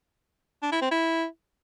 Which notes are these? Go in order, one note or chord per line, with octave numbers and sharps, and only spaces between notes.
D4
E4
C4
E4